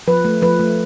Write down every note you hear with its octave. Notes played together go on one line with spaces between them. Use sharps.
F3 B4
A3
F3 B4
A3